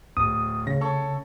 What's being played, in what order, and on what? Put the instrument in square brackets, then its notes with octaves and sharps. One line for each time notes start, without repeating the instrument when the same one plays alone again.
[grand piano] D1 [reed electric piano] D#6
[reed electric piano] C#3 [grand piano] A#6
[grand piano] A4 C#5 C#6